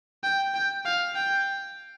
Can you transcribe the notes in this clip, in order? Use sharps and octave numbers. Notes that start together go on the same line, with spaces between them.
G5
G5
F5
G5